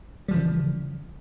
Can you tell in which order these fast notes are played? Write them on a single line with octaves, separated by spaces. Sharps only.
G3 F3 E3 C#3